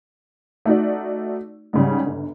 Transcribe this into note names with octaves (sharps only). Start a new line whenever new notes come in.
A3 D#4 F#4 D5
G#2 C#3 G3
G1